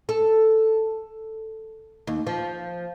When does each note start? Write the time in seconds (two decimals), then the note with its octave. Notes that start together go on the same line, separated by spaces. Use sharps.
0.09 A4
2.07 D#2
2.27 F3